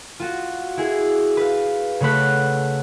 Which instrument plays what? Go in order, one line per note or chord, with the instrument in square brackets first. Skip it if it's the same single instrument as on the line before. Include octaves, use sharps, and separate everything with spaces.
[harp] F4 F#4
E4 G#4
B4 F5
C#3 A3 F#5 B5 F#6